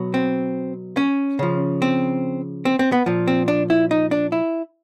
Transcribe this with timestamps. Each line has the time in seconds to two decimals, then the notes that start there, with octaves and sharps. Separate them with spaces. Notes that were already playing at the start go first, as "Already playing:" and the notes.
Already playing: B2 F#3
0.14 C4
0.97 C#4
1.39 C#3 F3
1.82 C4
2.65 C4
2.79 C4
2.92 B3
3.06 A#2 F3
3.28 C4
3.48 D4
3.70 E4
3.91 D#4
4.11 D4
4.32 E4